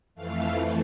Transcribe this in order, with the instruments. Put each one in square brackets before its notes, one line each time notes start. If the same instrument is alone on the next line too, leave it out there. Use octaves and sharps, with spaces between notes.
[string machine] F2 E3 A3 F5